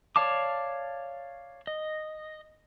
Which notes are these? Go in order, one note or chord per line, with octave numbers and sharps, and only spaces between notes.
C#5 D5 F5 A5 D6
D#5